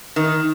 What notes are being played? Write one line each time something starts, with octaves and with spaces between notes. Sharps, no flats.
D#3